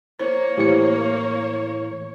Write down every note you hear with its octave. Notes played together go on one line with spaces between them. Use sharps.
A#3 C5 C#5
A2 E3 G4 C5 C#7